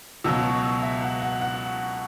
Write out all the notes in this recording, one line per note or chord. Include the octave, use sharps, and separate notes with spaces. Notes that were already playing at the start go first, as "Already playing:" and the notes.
C#2 B2 F#3 E6
C#6
E6
E5
F#5
F#5
F#5